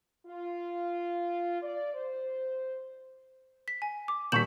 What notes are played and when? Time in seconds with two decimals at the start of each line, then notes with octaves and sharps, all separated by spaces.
0.26 F4
1.63 D5
1.94 C5
3.68 B6
3.82 G#5
4.08 D6
4.32 D#1 C#6 G6 B6 E7 F#7